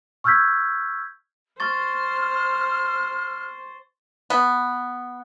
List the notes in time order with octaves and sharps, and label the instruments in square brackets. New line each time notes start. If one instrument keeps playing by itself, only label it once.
[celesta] C#6 E6 F6 G6 G#6 B6
[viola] C5 [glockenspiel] C#6 A6 [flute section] F6
[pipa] B3